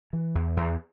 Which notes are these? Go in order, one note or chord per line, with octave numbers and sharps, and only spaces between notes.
E3
E2
E2